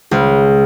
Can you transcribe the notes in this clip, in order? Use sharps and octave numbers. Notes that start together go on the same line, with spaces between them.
C#2